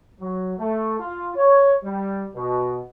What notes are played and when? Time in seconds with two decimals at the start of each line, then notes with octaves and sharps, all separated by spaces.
0.20 F#3
0.57 A3
1.00 F4
1.36 C#5
1.83 G3
2.35 B2